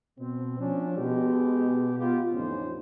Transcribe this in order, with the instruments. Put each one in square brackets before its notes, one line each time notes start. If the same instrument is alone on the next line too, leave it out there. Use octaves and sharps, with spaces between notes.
[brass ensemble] B2 C4
F3 C#4 D4
B2 G#3 G4
B3 F4 G4
A1 F2 D3 C#4 D#4 C5